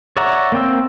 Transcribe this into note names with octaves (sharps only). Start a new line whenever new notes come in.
C#5 D5 E5 F#5 A#5
A#3 C4 G5 E6